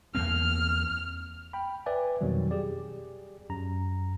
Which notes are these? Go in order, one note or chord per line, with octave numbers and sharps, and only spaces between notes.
E2 A#3 C4 F6
G5 B5
B4 D5 E5 G5 G#5
F2 B2 D#3 F#3 G3
G4 G#4 D5
F#2 A#5